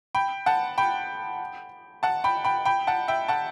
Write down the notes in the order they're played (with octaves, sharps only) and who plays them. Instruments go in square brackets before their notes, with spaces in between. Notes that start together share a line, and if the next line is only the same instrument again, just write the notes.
[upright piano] G5 B5
F#5 A5
G5 B5
F#5 A5
G5 B5
G5 B5
G5 B5
F#5 A5
E5 G5
F#5 A5